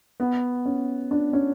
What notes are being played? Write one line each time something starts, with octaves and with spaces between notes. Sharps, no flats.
B3
C#4
D4
C#4